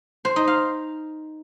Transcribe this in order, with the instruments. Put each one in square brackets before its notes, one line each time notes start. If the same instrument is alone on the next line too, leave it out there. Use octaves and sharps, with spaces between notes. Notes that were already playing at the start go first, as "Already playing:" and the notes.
[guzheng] C5
D#4
F5